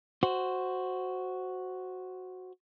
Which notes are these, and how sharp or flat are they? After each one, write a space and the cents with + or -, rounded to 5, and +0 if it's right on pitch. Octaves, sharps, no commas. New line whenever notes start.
F#4 +0 C5 +0